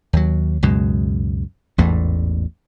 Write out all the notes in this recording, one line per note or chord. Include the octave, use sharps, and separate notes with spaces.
D#2 F#3
C#2 F#2 B2 G#3
A1 E2 G#2 A3